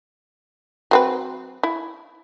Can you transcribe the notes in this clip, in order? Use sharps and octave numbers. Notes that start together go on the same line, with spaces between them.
F#3 C4 B4
E4